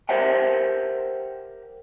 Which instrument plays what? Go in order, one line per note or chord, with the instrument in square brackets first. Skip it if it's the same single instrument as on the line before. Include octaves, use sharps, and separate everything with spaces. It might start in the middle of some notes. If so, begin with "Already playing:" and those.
[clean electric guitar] G4 A#4 C5 E5 F#5 G5